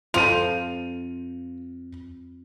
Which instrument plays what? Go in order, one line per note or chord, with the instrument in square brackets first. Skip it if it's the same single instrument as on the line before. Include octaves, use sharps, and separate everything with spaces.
[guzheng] F2 [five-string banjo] F4 C5 [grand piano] D#7 F7